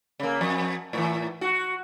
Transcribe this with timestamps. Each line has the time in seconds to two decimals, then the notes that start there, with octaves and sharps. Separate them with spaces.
0.20 C#3 A#3
0.41 F2
0.93 A2 E3
1.41 F#4